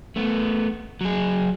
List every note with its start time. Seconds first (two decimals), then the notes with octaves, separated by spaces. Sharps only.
0.16 A3 B3
1.01 F#3 G#4